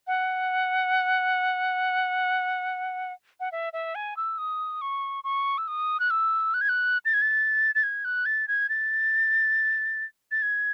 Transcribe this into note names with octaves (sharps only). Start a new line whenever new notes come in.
F#5
F#5
E5
E5
G#5
E6
D#6
C#6
C#6
E6
D#6
F#6
E6
F#6
G#6
F#6
A6
G#6
A6
A6
G#6
F#6
A6
G#6
A6
A6
G#6